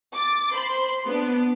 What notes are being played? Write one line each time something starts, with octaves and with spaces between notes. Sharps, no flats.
D6 A6
C5 B5 C6
B3 D4